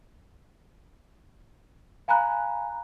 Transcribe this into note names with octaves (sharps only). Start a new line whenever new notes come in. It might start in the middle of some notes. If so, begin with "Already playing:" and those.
F5 G#5 A#5 B5 F#6